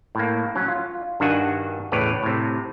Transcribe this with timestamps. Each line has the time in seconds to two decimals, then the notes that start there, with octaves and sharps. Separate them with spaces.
0.15 A2 A#3
0.55 F#3 C#4
0.68 F4
1.20 G2 D#3 D4 F#4 F#5 G#5
1.92 E2 A2 C#3 B4 C#5 D5
2.23 A2 C3